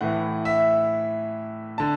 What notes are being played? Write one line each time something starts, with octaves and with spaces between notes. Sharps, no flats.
A2 E3 F#5
E5
D3 A5